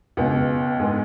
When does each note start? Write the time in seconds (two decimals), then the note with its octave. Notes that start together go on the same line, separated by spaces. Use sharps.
0.17 C#2 B2 B3
0.79 G#2 G#3 B3